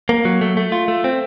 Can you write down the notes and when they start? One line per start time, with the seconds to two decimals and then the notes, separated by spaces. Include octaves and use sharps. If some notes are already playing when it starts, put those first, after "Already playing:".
0.09 A#3
0.25 F#3
0.41 A3
0.57 A3
0.72 F4
0.88 A3
1.04 C4